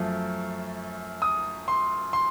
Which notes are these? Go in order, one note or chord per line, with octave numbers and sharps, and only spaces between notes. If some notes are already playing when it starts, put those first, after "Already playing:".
Already playing: F#2 F3 A3
D#6
C6
C6